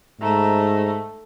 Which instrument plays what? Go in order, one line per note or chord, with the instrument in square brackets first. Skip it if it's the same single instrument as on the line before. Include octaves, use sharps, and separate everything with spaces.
[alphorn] G#2 [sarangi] A3 [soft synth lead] A#5